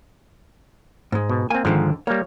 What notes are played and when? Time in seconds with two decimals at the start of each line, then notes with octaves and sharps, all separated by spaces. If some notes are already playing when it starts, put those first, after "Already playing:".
1.12 G#2 G#3
1.30 B2
1.50 A#3 C4 G#5
1.65 C#2 G#2 D3 D#3 F3
2.07 G3 A#3 C#5